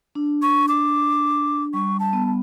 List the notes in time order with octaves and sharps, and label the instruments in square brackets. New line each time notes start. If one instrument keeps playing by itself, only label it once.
[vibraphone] D4
[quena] C#6
D6
[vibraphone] G3 [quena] C#6
[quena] A5
[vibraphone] B3
[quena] A5